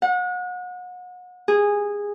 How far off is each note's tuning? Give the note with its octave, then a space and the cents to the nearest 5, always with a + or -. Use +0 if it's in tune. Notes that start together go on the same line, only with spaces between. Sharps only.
F#5 -35
G#4 -15